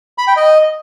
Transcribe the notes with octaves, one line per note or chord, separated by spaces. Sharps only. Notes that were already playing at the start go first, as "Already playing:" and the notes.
B5
G5
D#5